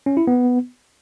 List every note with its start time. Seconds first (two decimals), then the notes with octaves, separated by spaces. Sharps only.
0.06 C#4
0.17 E4
0.27 B3